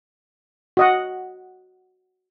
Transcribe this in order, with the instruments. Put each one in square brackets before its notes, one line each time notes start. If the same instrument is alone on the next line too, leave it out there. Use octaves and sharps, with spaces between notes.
[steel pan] F#4 D#5 F#5